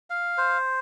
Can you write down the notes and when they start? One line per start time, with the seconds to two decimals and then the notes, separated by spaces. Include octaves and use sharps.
0.10 F5
0.38 C5